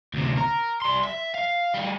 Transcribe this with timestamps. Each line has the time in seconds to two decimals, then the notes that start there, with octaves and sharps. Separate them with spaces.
0.14 D2 C3
0.37 A#4
0.82 G3 C6
1.04 E5
1.35 F5
1.75 G3 G#4